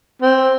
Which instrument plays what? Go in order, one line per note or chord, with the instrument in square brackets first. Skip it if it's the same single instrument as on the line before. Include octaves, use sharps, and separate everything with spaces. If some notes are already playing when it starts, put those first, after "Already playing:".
[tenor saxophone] C4